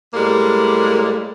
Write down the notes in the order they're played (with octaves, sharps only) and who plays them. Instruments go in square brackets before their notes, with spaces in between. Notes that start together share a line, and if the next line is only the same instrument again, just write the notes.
[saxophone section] A2 G3 G#3 A#3